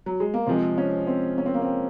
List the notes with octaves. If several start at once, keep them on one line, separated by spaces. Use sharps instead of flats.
F#3
G#3
A#3
C3 F3 G#3 C4
C#4
C4
C#4
C4
A#3
C4